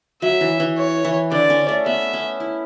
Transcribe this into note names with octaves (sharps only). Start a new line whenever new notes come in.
F#3 E5
E3
E3
C#5
E3
D3 D5
C#4
A3
B3 E5
C#4
E4